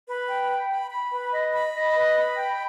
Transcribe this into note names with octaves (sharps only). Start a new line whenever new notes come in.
B4
G5
B5
B5
B5
B4
D#5
B5
D#5
B4
B5
G5